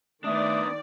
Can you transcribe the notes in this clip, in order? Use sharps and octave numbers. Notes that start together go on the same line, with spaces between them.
D#3 A3 B3 D4 D5 D#6